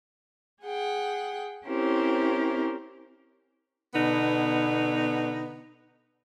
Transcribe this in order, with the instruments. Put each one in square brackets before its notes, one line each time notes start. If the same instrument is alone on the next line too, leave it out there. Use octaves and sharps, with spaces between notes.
[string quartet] G#4 F#5 G5
C4 C#4 E4 G4 A#4 C5
[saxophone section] B2 D3 B3 D#4